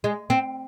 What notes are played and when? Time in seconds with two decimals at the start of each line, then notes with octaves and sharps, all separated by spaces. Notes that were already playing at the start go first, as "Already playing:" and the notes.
0.04 G#3
0.30 C4